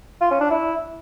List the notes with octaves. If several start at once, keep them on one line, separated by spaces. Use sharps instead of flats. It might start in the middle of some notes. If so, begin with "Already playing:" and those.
F4
C#4
D4
E4